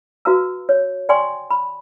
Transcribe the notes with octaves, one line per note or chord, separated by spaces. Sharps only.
F#4 B4 F5 A#5 E6
C#5
D5 G5 G#5 C6 C#6
B5